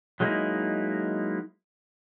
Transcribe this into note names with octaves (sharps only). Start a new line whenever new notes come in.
F#3 G#3 A#3 D#4 E4